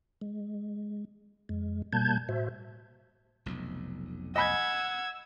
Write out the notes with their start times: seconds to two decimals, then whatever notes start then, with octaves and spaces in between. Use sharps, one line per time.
0.21 G#3
1.49 F2 G#3
1.93 B2 G3 A#3 A5 G6 G#6
2.29 A2 F#4 C5 E5
3.46 F1 B1 F2
4.36 D#5 F#5 G#5 B5 E6 G#6